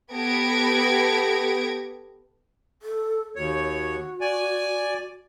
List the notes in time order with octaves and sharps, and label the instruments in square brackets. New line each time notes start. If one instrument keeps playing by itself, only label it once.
[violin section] B3 G4 A4 G#6 A#6 D7
[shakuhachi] A4
[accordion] D#2 C#5 [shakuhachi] F#4
[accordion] D5 G#5